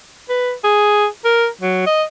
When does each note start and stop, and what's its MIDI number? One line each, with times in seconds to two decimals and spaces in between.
0.29 0.52 71
0.64 1.06 68
1.24 1.47 70
1.61 1.82 54
1.86 2.03 75